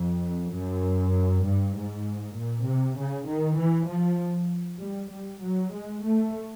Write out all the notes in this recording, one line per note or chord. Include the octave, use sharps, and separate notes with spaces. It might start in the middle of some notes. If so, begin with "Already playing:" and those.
Already playing: F2
F#2
G2
G#2
A#2
C3
C#3
D#3
E3
F3
G3
G3
F#3
G#3
A3